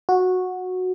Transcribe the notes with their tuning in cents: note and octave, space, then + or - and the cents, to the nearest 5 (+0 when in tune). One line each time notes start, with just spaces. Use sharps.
F#4 -10